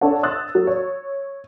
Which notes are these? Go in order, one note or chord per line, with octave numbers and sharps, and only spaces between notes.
D4 A4 C#5 F#5
D#6 E6 F#6 A6
F#3
C#5